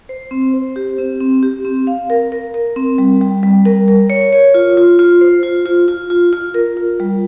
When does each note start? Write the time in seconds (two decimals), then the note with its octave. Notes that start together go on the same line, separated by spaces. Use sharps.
0.09 C5
0.31 C4
0.54 C5
0.76 G4
0.98 C4
1.20 C4
1.43 G4
1.65 C4
1.87 F5
2.10 A#4
2.32 A#4
2.54 A#4
2.76 C4
2.98 G3
3.21 G3
3.43 G3
3.65 A#4
3.88 A#4
4.10 C#5
4.33 C#5
4.54 F4
4.77 F4
4.99 F4
5.21 C5
5.43 F4
5.66 F4
5.88 F4
6.10 F4
6.33 F4
6.54 A#4
6.77 F4
7.00 G3